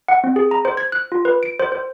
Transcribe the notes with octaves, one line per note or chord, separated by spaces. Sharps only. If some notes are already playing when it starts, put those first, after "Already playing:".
F#5
C4
G#4
A#5
C5
G#6
F#6
F4
B4
D7
C5
C5